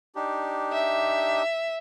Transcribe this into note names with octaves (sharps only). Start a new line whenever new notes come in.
D4 D#4 G4
E5